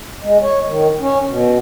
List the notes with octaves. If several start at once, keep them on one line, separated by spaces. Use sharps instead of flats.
G#3
C#5
D#3
C#4
B2